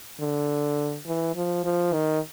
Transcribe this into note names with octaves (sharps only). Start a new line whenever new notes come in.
D3
E3
F3
F3
D#3